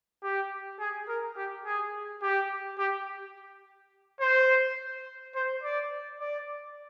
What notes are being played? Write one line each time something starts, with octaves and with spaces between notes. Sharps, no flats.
G4
G#4
A#4
G4
G#4
G4
G4
C5
C5
D5
D5